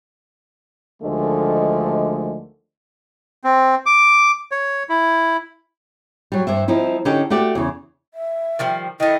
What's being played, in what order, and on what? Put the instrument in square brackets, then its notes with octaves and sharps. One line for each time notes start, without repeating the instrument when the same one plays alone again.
[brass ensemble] D2 D3 D#3 F3 G#3 A3
[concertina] C4
D6
C#5
E4
[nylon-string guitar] F#3 G3
G2 C5 E5
F3 C4 D#4 E4
D3 C#4 D#4 G4 A4
A3 F#4 G4 D5
E2 C#3
[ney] E5
[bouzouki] D#3 F3 G3
[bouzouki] D#3 A3 [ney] E4 [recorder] D#5